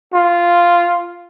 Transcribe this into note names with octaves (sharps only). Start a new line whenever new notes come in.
F4